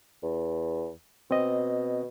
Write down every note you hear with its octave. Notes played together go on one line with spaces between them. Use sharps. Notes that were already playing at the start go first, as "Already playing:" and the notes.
E2
B2 C4 D#5